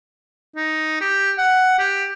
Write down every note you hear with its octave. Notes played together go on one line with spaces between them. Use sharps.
D#4
G4
F#5
G4